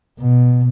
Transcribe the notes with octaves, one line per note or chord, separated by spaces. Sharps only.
B2